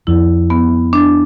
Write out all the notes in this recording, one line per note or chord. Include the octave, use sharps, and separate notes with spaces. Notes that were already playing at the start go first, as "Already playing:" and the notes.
F2 E4
B3
D4